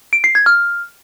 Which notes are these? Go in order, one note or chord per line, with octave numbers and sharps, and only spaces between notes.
D7
C7
G#6
F6